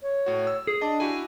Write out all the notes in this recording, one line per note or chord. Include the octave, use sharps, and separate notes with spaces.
C#5
A2 F#4
E6
G#4
D4 D#5 A5 D6
E4 F#4 G4 G#5